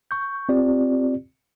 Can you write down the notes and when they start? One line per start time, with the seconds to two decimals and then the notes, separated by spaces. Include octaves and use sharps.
0.11 C#6 G6
0.49 C4 F4 G4 D5